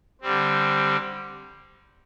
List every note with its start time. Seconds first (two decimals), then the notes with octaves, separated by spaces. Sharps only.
0.21 D3 G3 C4